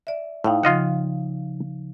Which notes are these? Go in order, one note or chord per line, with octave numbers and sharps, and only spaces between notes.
D5 E5
A2 D#4 F5 G5
C#3 F3 F4 D#5 F#5